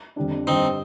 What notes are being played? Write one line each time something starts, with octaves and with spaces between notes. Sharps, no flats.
F2 D3 G3 D4
G2 D3 G3 C4 D#4